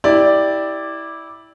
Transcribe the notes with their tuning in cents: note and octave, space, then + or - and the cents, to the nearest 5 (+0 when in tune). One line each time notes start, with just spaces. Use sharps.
E4 -15 G4 +5 D5 +0